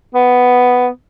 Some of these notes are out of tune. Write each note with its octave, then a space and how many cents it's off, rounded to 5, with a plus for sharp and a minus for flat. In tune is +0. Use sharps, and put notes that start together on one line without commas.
B3 +5